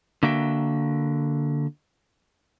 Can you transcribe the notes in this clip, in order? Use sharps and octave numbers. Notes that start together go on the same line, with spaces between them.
D3 A#3 F#4 E5 G5